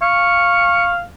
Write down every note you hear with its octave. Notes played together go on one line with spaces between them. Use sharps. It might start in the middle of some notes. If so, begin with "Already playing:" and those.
F5 C#6